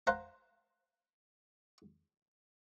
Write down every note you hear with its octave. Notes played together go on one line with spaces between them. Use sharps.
C5 F5 F#5 A#5